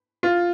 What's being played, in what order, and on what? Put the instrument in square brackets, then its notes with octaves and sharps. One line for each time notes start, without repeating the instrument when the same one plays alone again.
[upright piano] F4